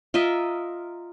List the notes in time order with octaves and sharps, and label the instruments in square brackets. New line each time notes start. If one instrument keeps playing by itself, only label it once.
[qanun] F4 A#4 D#5 E5